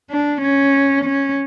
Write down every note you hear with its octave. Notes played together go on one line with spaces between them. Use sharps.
D4
C#4
C#4